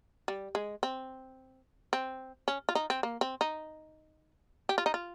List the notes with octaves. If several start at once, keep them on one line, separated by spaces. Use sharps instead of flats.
G3
G#3
C4
C4
C#4
F4
D#4
C4
A#3
C4
D#4
G4
F4
D#4
F4